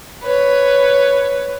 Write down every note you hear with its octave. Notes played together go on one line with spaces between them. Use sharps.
B4 C#5